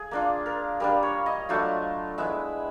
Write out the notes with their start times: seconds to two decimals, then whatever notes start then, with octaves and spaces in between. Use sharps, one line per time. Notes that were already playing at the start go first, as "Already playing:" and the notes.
Already playing: G#4
0.11 A#3 D4 F4
0.46 A#4
0.80 G3 A#3 D4 A#4
1.03 C#5
1.26 D#5
1.49 F#3 A3 D4 F4
2.18 G#3 B3 E4 E5